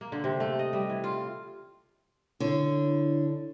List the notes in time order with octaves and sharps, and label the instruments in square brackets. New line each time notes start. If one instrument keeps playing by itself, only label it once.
[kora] A#3
D3
C3
A3
D#5
G3
E3
F4
[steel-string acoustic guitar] D3 C#5 [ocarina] E4